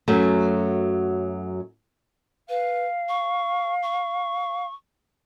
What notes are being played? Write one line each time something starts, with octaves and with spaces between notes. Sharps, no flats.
F#2 F#3 A3
B4 F5
C#6
C#6